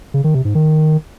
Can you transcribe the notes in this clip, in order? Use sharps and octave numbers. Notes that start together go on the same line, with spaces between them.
C#3
D#3
C3
G#2
D#3